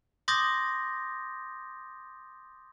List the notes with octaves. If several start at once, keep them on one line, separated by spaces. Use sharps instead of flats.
C6 D6 D#6 G6 A6 A#6